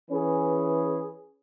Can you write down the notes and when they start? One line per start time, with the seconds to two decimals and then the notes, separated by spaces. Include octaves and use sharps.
0.11 E3 C#4 G#4 B4